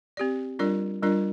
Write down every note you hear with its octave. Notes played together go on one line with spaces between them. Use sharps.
C4 G4 D5
G3 D4 F4 A#4 D5
G3 D4 F4 A#4 D5